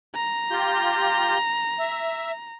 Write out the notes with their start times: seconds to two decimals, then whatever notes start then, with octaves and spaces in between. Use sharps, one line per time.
0.15 A#5
0.51 F4 G4 G6
1.79 E5